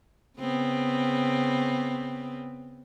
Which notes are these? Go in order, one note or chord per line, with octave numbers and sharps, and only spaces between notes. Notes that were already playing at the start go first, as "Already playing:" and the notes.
C#3 B3 C4